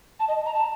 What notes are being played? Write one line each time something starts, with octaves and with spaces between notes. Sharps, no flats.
A5
D#5
A#5
A5